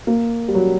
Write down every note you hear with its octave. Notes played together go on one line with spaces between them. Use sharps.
A#3
G3
F#3